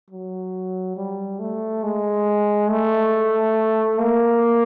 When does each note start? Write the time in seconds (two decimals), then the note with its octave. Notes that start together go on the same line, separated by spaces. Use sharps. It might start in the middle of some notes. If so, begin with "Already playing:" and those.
0.11 F#3
0.97 G3
1.39 A3
1.83 G#3
2.69 A3
3.98 A#3